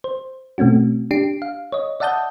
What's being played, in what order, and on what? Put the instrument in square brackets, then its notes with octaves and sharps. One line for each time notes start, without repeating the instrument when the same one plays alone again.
[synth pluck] C5
B2 A3 C4 C#4 F#4
D4 G4 C7 D7
F5
C#5 D#5
D5 E5 F#5 A5 D#6 G6